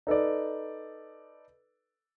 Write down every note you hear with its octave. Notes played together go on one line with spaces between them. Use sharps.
D#4 A4 B4 D5